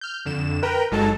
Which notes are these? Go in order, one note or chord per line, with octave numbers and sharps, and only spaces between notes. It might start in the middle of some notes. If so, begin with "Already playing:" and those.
F6 G6
F2 D3 E7
A#4 B4 G5 A#5
G1 F#3 G#3 D#4 A4 A5